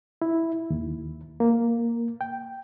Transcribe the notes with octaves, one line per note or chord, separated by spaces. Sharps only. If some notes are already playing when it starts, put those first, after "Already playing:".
E4
D#2
A#3
G5